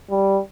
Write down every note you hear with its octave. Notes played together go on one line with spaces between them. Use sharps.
G3